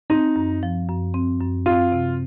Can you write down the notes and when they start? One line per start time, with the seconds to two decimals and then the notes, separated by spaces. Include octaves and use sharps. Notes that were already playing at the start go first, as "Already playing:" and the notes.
0.10 C4 D#4
0.36 F#2
0.63 F3
0.89 F#2
1.14 C4
1.40 F#2
1.66 C4 F4
1.92 C3